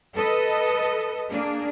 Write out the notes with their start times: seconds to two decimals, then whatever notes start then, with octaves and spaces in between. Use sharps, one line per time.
0.16 A4 B4 D#5
1.31 A#3 D4 G#4